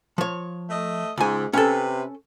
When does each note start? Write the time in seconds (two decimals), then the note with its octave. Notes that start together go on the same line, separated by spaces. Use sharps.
0.18 F3 C#5
0.70 A3 D#5
1.18 C#2 G#2 G#5
1.53 C3 C#4 A4 B4